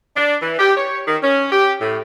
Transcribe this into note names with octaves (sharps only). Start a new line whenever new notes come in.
D4
E3
G4
C#5
D#3
C#4
G4
A2